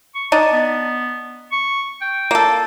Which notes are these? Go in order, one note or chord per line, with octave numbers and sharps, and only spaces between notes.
C#6
D4 D#4 A5
B3
C#6
G5
A#3 A4